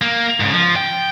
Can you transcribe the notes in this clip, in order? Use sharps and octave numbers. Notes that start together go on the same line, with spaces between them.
A#3
G#2 C#3
F3
G5